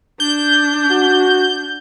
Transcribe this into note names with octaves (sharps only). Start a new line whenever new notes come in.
D4 G6
F#4